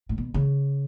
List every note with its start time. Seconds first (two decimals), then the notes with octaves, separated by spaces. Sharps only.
0.09 A2
0.18 B2
0.34 C#3